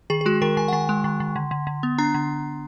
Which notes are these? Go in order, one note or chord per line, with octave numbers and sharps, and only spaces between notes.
D#3 G#4
G#4
G#3 F#4
D#3 A#4
D#3 G#5
F#5
D#3 G#5
G#3
D#3
D#3
D3
D3
D3
B3
D4 A#5
D3